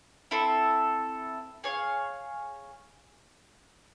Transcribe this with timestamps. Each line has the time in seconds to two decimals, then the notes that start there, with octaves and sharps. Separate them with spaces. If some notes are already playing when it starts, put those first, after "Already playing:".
0.31 C4 E4 A4
1.64 G#4 C#5 F5